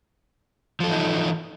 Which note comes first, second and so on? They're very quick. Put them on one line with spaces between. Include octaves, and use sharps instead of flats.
F3 A4 E3 D#4